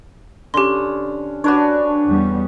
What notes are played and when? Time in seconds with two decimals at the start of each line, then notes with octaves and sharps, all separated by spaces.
0.54 D3 C#4 G4 C6
1.44 D4 F#4 B4 C#5
2.06 E2 G3 B3